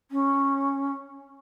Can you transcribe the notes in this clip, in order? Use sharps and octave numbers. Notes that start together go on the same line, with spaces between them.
C#4